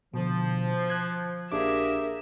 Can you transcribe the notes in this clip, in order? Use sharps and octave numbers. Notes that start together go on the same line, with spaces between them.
B2 D3 F3
F#6 G#6
A#1 A#3 D4 G4 G#4 A#4 E5 D6